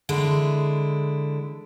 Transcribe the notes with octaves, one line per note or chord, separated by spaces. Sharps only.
D3 G#3 E4